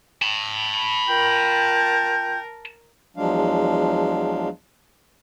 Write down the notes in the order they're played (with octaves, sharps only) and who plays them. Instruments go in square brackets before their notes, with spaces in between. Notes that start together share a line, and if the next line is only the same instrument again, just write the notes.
[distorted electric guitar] A5 B5
[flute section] F4 G5 G6 [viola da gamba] A#4
[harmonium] E2 F3 F#3 G#3 D4 F5